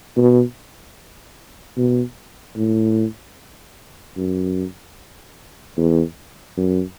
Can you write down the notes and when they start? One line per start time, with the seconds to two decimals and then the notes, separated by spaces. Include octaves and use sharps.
0.17 B2
1.77 B2
2.57 A2
4.17 F#2
5.77 E2
6.57 F#2